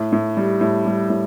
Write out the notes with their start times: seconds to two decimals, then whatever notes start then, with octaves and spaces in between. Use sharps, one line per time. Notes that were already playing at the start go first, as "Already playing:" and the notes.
Already playing: A2
0.12 A2
0.37 G3
0.61 A2
0.85 G3
1.10 A2